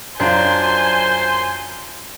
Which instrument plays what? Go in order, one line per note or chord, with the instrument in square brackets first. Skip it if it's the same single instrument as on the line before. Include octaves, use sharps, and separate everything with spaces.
[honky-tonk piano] F#2 [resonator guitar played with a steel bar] D4 F4 [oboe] C5 [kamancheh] G#5 C6